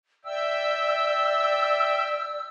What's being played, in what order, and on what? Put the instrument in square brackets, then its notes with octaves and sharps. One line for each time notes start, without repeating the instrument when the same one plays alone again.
[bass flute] D5 [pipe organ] E5 G5 [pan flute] E6